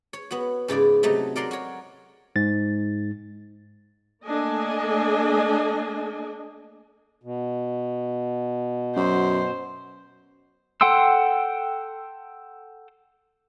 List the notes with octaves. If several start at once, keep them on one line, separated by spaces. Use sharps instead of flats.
C#5
B3 F#4
G#2 C#3 E4 D5
C3 F#3 A3 D#4
F#3 A#4 D5 F#5 A#5 C6
F#4 C#5
G#2 A6
A3 A#3 D4 A4 D#5 G#5
B2
F#2 C5
A4 F#5 G5 C6 E6